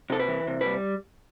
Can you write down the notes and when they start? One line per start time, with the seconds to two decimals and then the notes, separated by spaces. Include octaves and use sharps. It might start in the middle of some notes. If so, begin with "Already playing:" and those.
0.10 C3 A4
0.19 B4
0.28 E3
0.47 C3
0.61 G3 B4